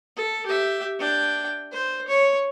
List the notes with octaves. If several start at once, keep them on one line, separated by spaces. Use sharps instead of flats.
A4
G4 E5
D4 G5
C5
C#5